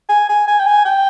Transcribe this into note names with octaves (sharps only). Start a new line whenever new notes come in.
G#5
G#5
G#5
G5
G#5
G5